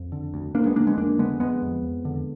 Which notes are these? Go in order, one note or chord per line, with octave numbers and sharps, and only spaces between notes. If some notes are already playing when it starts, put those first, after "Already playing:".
Already playing: F2
D3
D2
D2 A#3 D4
G#3 B3
D3 A#3 D4
G#3 B3
F2 A#3 D4
D3 G#3 B3
F2 G#3 B3
F2
F2
D3